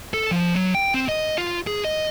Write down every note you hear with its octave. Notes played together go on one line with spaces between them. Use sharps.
A4
F3
F#3
G5
C4
D#5
F4
G#4
D#5